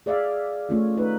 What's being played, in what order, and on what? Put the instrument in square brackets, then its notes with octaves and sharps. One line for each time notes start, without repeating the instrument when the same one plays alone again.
[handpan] G#4 D5 E5 F5
A3 C#4 F4
D#4 B4